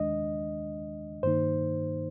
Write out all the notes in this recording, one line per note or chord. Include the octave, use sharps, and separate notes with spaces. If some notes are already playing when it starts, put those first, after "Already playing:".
Already playing: D#2 D#3 G#3 D4 D#5
G2 D#3 A#3 D#4 C5